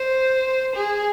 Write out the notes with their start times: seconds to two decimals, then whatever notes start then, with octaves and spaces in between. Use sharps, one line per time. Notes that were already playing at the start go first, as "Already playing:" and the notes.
Already playing: C5
0.75 G#4